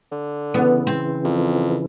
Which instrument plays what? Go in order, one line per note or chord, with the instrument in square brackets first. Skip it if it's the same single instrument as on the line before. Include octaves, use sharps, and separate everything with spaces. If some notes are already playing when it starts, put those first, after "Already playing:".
[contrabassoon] D3
[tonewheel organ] C#3 E3 [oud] B3
[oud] C4
[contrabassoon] F2